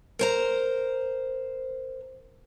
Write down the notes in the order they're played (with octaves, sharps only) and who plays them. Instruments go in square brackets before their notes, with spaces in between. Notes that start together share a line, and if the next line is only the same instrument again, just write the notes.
[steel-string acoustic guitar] A#4 C5 A#5